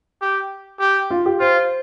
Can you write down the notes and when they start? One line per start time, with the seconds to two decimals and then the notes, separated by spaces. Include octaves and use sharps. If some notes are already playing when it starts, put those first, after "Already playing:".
0.22 G4
0.80 G4
1.11 F4
1.26 G4
1.40 F4 C5